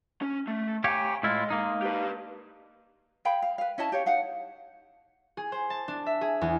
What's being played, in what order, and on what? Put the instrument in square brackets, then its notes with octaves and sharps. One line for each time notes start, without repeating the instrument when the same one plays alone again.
[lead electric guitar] C#4
A3
[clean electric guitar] G4 C#5 [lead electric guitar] F5 G#5
[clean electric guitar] A2 E4 F4 [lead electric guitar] G#3
[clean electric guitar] A#3 D#4
[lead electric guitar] G4 B4
[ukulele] G#4 F5 G5 B5
F5
B4 F5
C#4 E4 D#5 A5
G4 C#5 F5
D#4 F5 F#5
[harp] G#4
C5
A5
D4
E5
G#4
E2